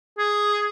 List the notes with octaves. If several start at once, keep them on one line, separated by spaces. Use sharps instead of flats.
G#4